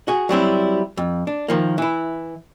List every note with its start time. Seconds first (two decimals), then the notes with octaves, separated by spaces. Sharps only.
0.08 F#4 G#4
0.29 F#3 G3 C4 E4
0.97 F2
1.27 D4
1.48 D#3 F3 A#3
1.78 E3 E4